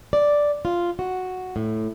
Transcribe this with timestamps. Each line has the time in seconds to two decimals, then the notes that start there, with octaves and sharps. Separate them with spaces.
0.13 D5
0.65 F4
0.99 F#4
1.56 A2